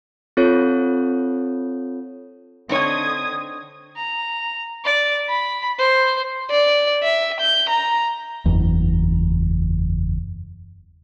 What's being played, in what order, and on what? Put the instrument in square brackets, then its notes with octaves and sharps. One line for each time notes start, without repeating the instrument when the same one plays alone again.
[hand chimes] C4 F4 A4 C#5
[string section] D3 D#6 G#6 [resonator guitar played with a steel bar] C4 D#4 C#5
[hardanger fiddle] A#5
D5
B5
C5
[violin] D5
E5
G6
A#5
[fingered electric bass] F#1 E2